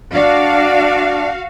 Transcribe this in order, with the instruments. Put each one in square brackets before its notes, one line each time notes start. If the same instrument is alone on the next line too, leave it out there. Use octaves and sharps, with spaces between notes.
[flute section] D4 [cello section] F#4 F5